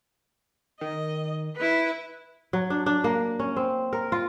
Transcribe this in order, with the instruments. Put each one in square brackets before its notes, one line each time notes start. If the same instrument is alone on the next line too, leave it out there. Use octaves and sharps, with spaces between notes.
[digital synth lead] D#3 [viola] D#5
[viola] E4 B4
[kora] F#3
D4
D4
A#3
C#4
C4
A#4
F4